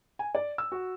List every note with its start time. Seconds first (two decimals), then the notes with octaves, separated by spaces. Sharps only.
0.19 G#5
0.35 D5
0.58 E6
0.72 F#4